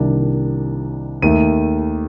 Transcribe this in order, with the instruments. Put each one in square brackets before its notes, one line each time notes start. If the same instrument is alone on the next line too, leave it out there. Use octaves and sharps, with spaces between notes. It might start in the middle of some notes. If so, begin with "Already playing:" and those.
Already playing: [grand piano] C2 C3 D#3 A#3 D4
D#2 D#3 A3 D#7